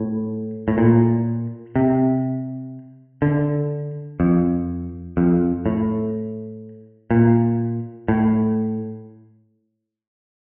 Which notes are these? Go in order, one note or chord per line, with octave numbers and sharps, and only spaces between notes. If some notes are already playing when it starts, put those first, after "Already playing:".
Already playing: A2
A2
A#2
C3
D3
F2
F2
A2
A#2
A2